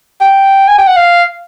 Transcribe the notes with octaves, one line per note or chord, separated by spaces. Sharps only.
G5
G#5
G5
F#5
F5